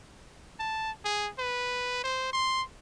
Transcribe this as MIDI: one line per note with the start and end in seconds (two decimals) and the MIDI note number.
0.60 0.91 81
1.05 1.29 68
1.39 2.01 71
2.03 2.28 72
2.33 2.62 84